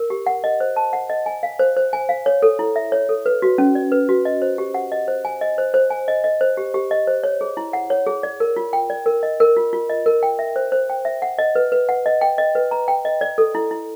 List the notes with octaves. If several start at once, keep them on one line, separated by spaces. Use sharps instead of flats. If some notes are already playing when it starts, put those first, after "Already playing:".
Already playing: A#4
G4
F#5
D#5
C5
A5
F#5
D#5
G#5
F5
C5
C5
G#5
F5
C#5
A4
E4
E5
C#5
A4
B4
F#4
C#4
D5
B4
F#4
D#5
C5
G4
F#5
D#5
C5
G#5
D#5
C5
C5
G#5
D#5
D#5
C5
G4
G4
D#5
C5
C#5
G#4
E4
F#5
C#5
G#4
D5
A#4
F4
G5
D5
A#4
D#5
A#4
F4
F4
D#5
A#4
G5
E5
C5
C5
G5
E5
F#5
D#5
B4
B4
F#5
D#5
G5
D#5
B4
A#5
G5
D#5
D5
A4
E4
E4